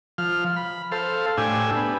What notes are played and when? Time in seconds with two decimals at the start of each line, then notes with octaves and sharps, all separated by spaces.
0.18 F3 F6
0.56 B5
0.92 A4 C5 F5
1.37 A2 D4 G4 G#5 E6
1.76 B3